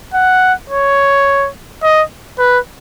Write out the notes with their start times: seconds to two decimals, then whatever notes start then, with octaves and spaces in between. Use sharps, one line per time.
0.14 F#5
0.70 C#5
1.83 D#5
2.39 B4